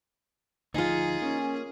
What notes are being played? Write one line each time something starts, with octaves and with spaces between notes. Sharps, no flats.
D2 F3 D#4 F4 G#4
A#3 C#4